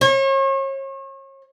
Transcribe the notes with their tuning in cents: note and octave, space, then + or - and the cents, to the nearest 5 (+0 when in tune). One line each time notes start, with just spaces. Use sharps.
C#5 -40